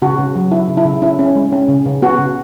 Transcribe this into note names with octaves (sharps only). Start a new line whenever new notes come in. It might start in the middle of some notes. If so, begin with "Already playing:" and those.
C#3 F#4
C#3
F#3
F#3 E4
C#3
E4
C#3
C#4 E4
C#4
G#3
C#4
C#3
C#3
B3 F#4
C#3